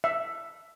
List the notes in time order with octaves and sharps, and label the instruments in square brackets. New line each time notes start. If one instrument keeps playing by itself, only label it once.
[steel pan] E5